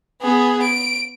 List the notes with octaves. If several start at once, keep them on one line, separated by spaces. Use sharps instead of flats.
B3 G#4
D7